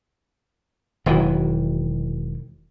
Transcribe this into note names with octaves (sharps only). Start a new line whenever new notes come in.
E1 D#3 E3 F#3